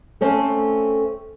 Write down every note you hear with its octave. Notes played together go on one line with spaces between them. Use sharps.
A3 C4 C#4 A4